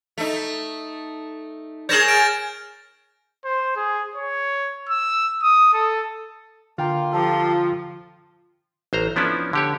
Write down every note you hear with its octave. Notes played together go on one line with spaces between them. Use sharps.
A3 D#4
G#4 A#4 C#5 G6 A#6 E7
F6 A6 D7
C5
G#4
C#5
E6
D#6
A4
D3 A#3 F4 G5 A#5
F3 G4 A4
A1 C5 A#5
F3 B3 C#4 D4 E4
D3 G4 C#5